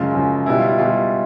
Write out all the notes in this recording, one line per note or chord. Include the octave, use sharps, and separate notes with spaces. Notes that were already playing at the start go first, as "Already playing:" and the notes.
Already playing: F#2 C#3 F3 G#3 F4
F#2 C#3 F3 G#3
B2 G3 E4
F4
E4
B2 G3 F4